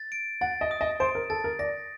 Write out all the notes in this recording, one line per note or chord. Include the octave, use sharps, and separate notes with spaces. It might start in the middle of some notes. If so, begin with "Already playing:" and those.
Already playing: A6
D7
F#5 A6
D#5
D#6
D#5
C5 D7
A#4
A4 A6
A#4
D5 A#6